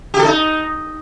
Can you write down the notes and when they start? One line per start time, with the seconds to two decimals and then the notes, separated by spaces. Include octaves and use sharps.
0.14 G4
0.19 A4
0.25 D#4